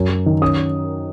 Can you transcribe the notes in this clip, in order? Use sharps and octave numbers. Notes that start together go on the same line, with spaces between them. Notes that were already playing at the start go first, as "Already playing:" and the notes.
Already playing: F#2
F#3
D#3
C#4 D#6